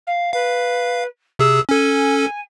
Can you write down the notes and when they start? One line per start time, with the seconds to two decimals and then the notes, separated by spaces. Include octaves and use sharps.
0.06 F5
0.33 B4 F5
1.39 C3 G#4 E6
1.69 C#4 A4 G#5